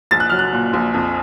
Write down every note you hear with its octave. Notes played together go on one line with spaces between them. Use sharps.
A#1 A6
F#6
F#3 F6
F#6
A#2
A#1
F2